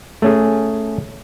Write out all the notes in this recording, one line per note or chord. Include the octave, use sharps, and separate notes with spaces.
A3 C#4 G#4